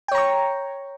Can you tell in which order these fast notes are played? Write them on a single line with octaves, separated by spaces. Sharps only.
G5 C#5 A#5 C#6